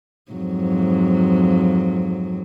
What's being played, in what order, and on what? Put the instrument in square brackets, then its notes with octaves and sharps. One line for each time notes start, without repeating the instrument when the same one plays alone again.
[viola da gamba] F2 G#2 F#3